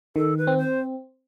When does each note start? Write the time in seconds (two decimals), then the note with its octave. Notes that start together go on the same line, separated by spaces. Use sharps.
0.16 D#3 A4
0.38 B4
0.47 C4
0.58 C5